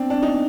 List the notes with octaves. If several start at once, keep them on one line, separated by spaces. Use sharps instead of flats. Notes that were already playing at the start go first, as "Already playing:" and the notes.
Already playing: C4 D4
D4
D#4